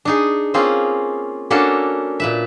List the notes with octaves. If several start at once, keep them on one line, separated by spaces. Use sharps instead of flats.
D4 D#4 G#4
A#3 C4 C#4 F4 G#4
A#3 C#4 D4 F#4 A4
A#2 B4 E5